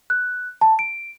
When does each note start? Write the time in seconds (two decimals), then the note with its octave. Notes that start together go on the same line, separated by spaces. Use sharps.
0.10 F#6
0.61 A5
0.79 D7